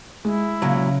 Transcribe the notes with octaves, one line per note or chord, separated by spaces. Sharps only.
G#3 E4
A#2 C#3 F#3